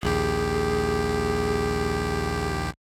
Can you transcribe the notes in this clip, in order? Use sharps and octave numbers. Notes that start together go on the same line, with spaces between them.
A#1 D#2 G4 G#4